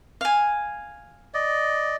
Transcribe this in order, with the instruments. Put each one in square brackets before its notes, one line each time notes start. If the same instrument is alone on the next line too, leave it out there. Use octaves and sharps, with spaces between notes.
[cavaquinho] F5 G#5
[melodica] D5 D#5